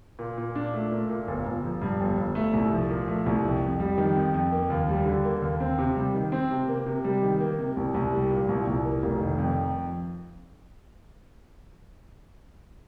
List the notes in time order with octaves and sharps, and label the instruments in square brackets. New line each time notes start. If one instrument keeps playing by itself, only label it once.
[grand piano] A#2
A#2
D4
A3
A#2
A#2
G1
G1
F3
G2
G1
G1
A3
C2
F3
A#2
A3
C2
F2
F2
G3
D#3
F2
F2
A#3
D#2
G3
D3
A#3
D#2
C4
C3
G3
D#3
C4
C3
A#3
C3
G3
D#3
A#3
C3
C2
C2
G3
A#2
C2
C2
A#3
F1
D#3
F2